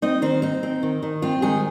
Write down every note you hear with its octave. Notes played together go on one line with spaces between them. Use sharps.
C4 D#4 D#5
D#3 C4 C5
C4 D#4
C4
D#3
D#3
C4 F4
D#3 G#3 G#4